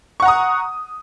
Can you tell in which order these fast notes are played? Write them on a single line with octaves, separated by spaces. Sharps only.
C#6 F#5 A#5 D#6